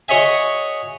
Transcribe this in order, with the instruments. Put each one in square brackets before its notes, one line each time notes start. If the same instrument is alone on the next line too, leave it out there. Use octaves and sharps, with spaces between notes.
[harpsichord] F#4 G#4 C#5 D#5 E5 G#5